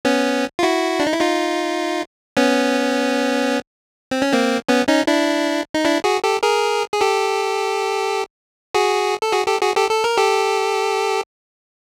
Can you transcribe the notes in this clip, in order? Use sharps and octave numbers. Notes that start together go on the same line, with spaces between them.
B3 C#4
F4
E4 F#4
D4
D#4
E4
D#4 F4
B3 C#4
C4
C#4
A#3 C4
B3 C#4
C#4 D#4
D4 E4
D#4
D4 E4
F#4 G#4
G4 A4
G#4 A#4
G#4
G4 A4
F#4 G#4
A4
F#4 G#4
G4 A4
F#4 G#4
G4 A4
A4
A#4
G4 A4